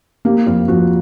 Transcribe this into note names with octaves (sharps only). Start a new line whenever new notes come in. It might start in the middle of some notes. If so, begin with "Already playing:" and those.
A#3 G4
F2 F4
F3 F#4